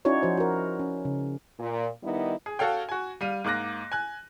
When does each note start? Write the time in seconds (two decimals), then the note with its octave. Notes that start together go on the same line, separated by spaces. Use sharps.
0.05 C#4 D#4 E4 F#4 C#5 D5
0.23 F3 F#4 C5
0.37 F#4 A#4
0.79 C#4
1.05 C#3
1.60 A#2
2.03 D#3 G3 B3 D#4 E4
2.46 G#4
2.59 F#4 A4 C#5 F5 G5
2.89 F#4 G#5
3.21 G3 F5 D#7
3.44 G#2 A#3 D6 F#6 A#6
3.92 G#5 F#6